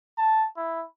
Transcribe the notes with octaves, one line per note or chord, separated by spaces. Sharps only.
A5
E4